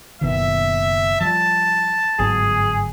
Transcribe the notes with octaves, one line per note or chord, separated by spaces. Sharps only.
F#1 B2 D#3 E5
F3 G3 A5
G1 G#2 F#3 G#4